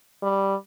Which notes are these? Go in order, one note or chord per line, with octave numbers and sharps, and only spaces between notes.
G3